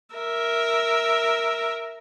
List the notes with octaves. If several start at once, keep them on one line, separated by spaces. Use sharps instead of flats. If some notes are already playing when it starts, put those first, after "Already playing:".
A#4 E5